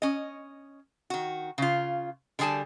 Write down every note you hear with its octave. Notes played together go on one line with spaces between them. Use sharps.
C#4 D#5
D#3 F#4
C#3 F4
D3 G3 G#4 G#5 A5